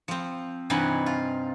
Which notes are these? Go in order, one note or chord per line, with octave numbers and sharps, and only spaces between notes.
F3 C4
G2 C3 E3 D#4 F#5 G#5
F4